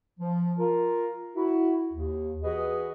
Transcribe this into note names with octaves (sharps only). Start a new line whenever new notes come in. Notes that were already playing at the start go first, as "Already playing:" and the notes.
F3
F4 A#4
E4 F#4
D#2
E3 F#4 G#4 B4 D#5